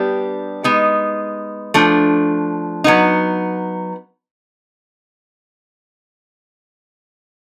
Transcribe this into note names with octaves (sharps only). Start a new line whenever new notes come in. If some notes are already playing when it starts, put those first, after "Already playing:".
Already playing: G3 B3 D4 G4
G#3 B3 D#4
F3 A3 D4
F#3 B3 D#4